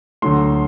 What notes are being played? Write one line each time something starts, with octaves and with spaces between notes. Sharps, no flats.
D2 D3 F#3 A3 C6